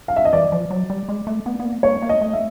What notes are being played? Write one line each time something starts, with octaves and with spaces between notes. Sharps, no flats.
F5
E5
D#5
E3 D5
F3
F#3
G3
G#3
A3
B3
B3
A#3
A#3 C#5
A#3
D#5
A3
E5